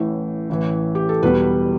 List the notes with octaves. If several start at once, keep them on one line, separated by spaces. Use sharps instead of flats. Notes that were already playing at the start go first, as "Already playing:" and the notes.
Already playing: A1 A2 E3
A1 A2 E3
G4
A4
E1 E2 B2 G3 B3 B4